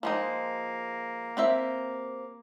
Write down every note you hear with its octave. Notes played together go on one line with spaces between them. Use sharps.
F3 G#3 A#3 D#4
C4 G4 E5